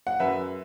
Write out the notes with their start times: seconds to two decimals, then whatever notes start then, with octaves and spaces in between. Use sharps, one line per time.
0.07 F#5
0.20 F#2 B4 E5